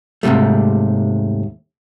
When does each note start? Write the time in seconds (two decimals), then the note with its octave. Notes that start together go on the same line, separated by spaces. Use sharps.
0.23 D#2 G#2 C3 G3 A3